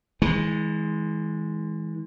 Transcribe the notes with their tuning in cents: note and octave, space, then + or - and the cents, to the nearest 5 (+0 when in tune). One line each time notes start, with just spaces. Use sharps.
E3 -40 G#3 +0